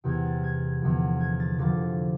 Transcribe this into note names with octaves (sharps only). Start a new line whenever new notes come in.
E2 C3 E3 G#6
A6
G#6
E2 D3 F3
G#6
A6
F2 D3 F3 A6